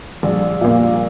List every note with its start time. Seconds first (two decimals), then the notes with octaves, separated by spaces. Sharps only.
0.23 A#1 G3
0.61 A#2 A#3